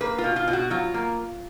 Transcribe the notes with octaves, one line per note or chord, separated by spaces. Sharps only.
A#3 B4
F4
B2
F4
B2
F#4
F#3 F4
A#3